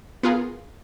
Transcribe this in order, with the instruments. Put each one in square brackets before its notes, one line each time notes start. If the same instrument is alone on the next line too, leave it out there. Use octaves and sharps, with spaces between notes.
[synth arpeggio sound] B3 F4 G#4 A#4